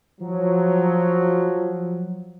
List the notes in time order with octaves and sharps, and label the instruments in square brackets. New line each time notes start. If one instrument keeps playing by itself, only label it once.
[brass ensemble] F3 F#3